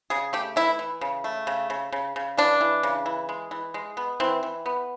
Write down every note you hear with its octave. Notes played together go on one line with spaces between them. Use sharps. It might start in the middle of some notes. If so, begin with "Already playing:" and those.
C#3 G#4
A3 G4
E3 E4
E3
C#3
A3
C#3
C#3
C#3
C#3
E3 D4
E3
C#3
E3
G#3
E3
G#3
B3
E3 C4
E3
B3